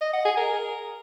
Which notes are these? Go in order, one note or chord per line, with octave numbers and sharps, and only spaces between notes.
D#5
F#5
G#4
A#4